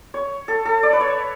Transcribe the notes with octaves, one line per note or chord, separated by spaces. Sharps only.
C#5
A4
A4
D5
B4
C#5